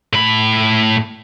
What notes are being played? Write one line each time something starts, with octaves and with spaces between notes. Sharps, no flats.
A2 B5